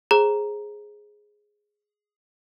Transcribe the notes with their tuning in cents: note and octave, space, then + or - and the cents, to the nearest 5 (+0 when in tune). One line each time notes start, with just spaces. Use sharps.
G#4 +0 C5 +30 A#5 +0